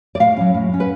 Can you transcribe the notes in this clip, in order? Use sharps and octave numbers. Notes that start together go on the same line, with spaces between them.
D5
A2 F5
F#3 C#4
A2
F#3 C#4
B4